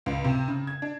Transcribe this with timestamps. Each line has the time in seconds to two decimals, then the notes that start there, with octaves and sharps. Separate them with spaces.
0.06 C#2
0.24 C3
0.48 C#3
0.67 G#6
0.82 D4